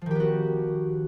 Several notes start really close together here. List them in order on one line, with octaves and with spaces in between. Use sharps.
F3 D#3 G4 B3 F#4